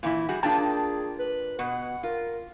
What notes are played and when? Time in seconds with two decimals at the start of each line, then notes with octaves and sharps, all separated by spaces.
0.03 A#2 E3 E4
0.29 G3 F#4 G#4
0.43 A#3 D4 F4 G#4 G5 A5
1.19 B4
1.59 B2 F#5
2.03 F4 A#4